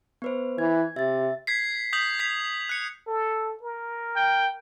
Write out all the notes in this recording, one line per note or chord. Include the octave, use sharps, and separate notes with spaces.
B3 B4 C5
E3 G#6
C3 E5 A6
G#6 B6 C7
D#6 G6 B6 F#7
G#6 B6 C7 F7
F#6 C#7
A4
A#4
G5